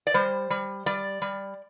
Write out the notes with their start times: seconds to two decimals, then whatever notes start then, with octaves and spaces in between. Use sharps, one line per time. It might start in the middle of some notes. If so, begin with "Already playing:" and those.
0.07 D5
0.14 G3 C5
0.50 G3
0.86 G3 D5
1.22 G3